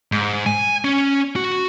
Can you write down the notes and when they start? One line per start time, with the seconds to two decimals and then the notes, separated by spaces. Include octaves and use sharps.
0.12 G#2
0.46 G#5
0.85 C#4
1.36 F#4